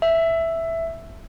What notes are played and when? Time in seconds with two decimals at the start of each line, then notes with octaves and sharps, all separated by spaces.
0.02 E5